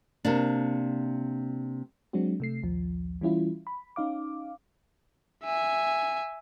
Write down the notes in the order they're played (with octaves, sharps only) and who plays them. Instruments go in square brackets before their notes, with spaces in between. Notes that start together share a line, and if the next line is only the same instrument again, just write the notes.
[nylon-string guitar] C3 A#3 D4
[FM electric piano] F#3 G#3 C4 D4 F#4
C3 A3 C7
A#1 D#2 F3
E3 G3 C#4 E4 F4
B5
C#4 D#4 F5 D6
[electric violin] E5 G#5